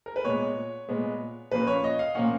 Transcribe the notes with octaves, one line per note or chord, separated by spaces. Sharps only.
A#4
B4
A#2 G#3 B3 C#5
A#2 G#3 B3
A#2 F3 A#3 C#4 B4
C#5
D#5
F5
A#2 F3 A#3 C#4 F#5